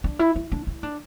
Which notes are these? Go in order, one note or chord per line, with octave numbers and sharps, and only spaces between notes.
D4
E4
E4
D4
E4
D4